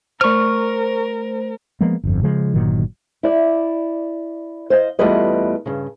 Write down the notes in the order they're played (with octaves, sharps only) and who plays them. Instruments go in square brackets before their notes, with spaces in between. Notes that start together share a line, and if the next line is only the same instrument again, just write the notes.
[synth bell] A3 C5 [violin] A#4 [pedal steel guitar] C#6 F6
[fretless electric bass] F3 G#3 A#3 B3
G1 F2
C#3 F3 G#3
G1 A#2 D#3 F#3
[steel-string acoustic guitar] E4 D5
C5 D#5 F5
E2 G3 A3 F4 B4 D#5
G2 C#3